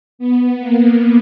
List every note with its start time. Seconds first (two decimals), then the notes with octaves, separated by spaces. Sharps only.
0.19 B3
0.60 A#3